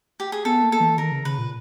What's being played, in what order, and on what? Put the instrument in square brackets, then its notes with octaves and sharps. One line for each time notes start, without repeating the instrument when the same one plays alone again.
[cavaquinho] G4
G#4
[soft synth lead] B3 [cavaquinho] A4
[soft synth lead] A#3
[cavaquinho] A4
[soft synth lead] E3
[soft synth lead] D#3 [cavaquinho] A#4
[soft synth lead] C#3
[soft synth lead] C#3 [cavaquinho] B4
[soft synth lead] A#2